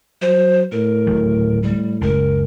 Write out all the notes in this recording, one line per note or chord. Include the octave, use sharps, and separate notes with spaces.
F#3 C5
A2 A#4
D1 D#3 F#3
A2 G3
F#1 C#2 A#4